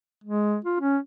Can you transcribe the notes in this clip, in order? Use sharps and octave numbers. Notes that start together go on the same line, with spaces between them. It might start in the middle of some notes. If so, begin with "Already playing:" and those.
G#3
F4
C#4